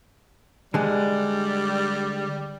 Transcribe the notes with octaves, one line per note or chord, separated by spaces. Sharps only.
D3 G3 G#3